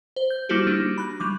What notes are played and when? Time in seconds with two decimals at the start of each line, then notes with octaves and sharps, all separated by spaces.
0.16 C5
0.30 G6
0.49 G3 A#3 E4 F#4 G4
0.67 G3 A#3 D4 D#4
0.98 B5 F#6
1.20 F#3 G3 D6